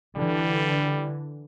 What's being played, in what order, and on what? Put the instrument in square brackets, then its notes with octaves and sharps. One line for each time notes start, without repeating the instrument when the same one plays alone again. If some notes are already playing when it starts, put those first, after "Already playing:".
[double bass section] D3 E3 [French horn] G3